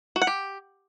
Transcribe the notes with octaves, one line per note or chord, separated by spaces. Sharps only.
F#4
F#5
G4